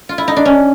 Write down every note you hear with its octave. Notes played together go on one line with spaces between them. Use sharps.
F4
E4
D#4
D4
C#4